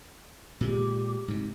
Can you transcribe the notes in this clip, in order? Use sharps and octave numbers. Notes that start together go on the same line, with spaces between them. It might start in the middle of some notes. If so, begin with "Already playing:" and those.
A#2 G#3 G4
G#2 C3